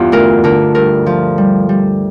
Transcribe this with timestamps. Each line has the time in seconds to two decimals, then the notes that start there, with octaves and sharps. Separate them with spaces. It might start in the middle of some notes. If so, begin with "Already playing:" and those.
Already playing: E2 G2 F4 G4
0.12 D2 A#4
0.44 D3 A#4
0.75 G2 A#4
1.06 F3
1.38 G3
1.69 G3